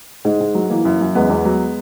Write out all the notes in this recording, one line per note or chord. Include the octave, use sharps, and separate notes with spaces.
G#2 G#3
G#2
F#3
E3 A#3
F#2
F#2
E2 G#3 B3
E2
F#3